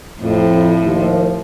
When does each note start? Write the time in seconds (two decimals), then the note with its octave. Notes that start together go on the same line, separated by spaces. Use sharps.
0.21 F2 A2
0.82 D#2 F3